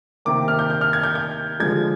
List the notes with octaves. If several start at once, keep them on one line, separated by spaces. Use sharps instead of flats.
C3 D#3 A#3 D6
F6
G6
G6
F6
G#6
G6
G6
D3 F3 G#3 G#6